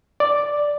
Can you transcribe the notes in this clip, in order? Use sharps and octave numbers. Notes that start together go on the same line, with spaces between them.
D5